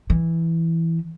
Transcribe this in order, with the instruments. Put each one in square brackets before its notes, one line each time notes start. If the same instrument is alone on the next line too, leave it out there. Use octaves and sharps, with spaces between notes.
[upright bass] E3